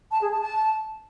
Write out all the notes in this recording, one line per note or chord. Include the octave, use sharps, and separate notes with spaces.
A5
G#4
A5
A5